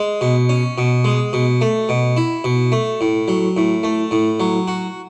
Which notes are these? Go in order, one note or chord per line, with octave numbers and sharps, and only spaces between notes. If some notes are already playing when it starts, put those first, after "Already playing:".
Already playing: G#3
B2
C#4
B2
G#3
B2
A3
B2
E4
B2
A3
A2
F#3
A2
A3
A2
F#3
F#4